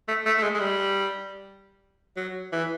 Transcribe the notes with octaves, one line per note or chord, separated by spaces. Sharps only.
A3
A3
A3
G#3
G#3
G3
F#3
E3